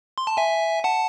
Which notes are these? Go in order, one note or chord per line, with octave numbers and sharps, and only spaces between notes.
C6
A5
E5 G#5
F#5 A5